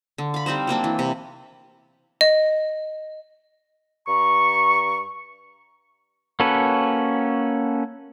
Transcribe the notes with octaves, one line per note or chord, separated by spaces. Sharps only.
D3
F5 B5
G3 C4 D#4 C5
F#3 A#3 C4 D4
E3
C3
D#5
G2 A#5 C#6
A#3 C#4 F#4 A4 B4